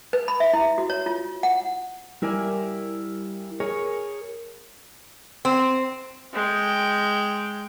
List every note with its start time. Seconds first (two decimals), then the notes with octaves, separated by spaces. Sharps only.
0.13 B4
0.28 B5
0.40 E5
0.53 E4
0.78 F#4
0.90 C#5
1.06 F4
1.43 F#5
2.22 G3 E4 A#4 D5 G#5
3.60 G#4 A#4 C#5
5.45 C4
6.34 G#3 G5